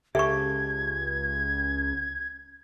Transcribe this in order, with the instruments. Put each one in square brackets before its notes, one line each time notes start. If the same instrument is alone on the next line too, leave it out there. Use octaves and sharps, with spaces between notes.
[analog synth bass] C#2 [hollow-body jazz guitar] G4 A4 [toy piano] E5 C#6 [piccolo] G#6